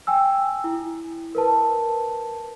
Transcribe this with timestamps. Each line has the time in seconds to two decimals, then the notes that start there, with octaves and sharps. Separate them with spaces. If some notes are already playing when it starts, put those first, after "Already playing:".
0.07 G5 G#5 E6
0.64 E4
1.35 A#4 B4 A5